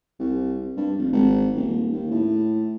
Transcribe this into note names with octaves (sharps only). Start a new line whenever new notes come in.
C2
G2
F1
G#1
D#1
D#2
A2